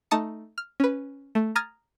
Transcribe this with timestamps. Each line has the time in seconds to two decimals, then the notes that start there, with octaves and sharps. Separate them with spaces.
0.11 A3 D#4 A5 D#6 C#7
0.58 F6
0.80 C#4 B4
1.35 A3
1.55 A#5 D#6 F6 G#6 A6